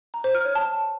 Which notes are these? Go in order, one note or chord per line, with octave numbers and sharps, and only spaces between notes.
A#5
C5
F6
C#5
A5